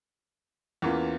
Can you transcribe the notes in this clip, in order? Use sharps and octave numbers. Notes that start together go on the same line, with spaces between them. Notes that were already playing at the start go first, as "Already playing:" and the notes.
E2 E3 A#3 C#4 F4